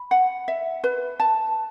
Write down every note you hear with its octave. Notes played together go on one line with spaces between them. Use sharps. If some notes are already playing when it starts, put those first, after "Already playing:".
Already playing: B5
F#5
E5
B4
A5